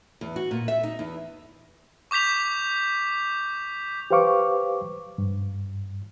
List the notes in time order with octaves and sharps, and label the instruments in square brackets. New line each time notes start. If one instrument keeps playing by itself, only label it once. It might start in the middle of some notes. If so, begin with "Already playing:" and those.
[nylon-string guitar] E2
F#4
A#2
E5
D#4
E2
[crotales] C#6 D6 G6 B6 F7
[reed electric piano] G4 B4 C5 F5 C#6 D6
G2